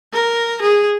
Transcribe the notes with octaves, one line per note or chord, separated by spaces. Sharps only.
A#4
G#4